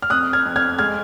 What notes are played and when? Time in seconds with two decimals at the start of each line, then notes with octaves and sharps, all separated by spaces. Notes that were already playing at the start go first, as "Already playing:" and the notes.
0.02 F6
0.10 F2 D#6 F#6
0.33 F6 G#6
0.45 F2
0.56 F6 G#6
0.78 G#3 F6 G#6